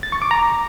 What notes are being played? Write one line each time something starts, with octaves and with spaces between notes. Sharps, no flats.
A6
C#6
D6
A#5